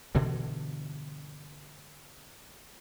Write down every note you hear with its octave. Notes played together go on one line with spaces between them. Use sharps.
G2 B2 D3 E3